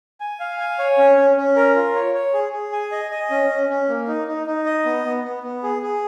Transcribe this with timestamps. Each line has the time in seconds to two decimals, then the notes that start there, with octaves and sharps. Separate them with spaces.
0.20 G#5
0.40 F5
0.60 G#5
0.79 C#5
0.98 C#4
1.17 C#4
1.37 C#4
1.56 A#4
1.75 F4
1.95 C#5
2.14 C#5
2.34 G#4
2.53 G#4
2.72 G#5
2.92 D#5
3.11 D#5
3.30 C#4
3.50 C#4
3.69 C#4
3.89 A#3
4.08 D#4
4.28 D#4
4.47 D#4
4.66 D#5
4.86 B3
5.04 B3
5.24 B3
5.43 B3
5.63 G#4
5.83 G#4